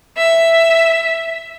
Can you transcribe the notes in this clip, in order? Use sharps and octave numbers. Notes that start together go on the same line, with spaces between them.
E5